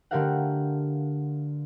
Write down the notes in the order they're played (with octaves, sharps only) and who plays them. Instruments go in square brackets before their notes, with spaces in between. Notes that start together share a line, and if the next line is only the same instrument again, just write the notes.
[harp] D3 A3 G4 A#4 F5 F#5